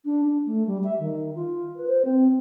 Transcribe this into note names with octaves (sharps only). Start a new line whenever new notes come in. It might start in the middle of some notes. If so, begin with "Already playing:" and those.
D4
D4
A3
G3
E5
D#3
F4
B4
C5
C4